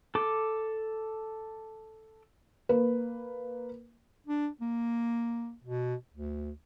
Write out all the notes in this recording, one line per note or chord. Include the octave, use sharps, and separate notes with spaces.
A4 D6
A#3 B4
D4
A#3
B2
D2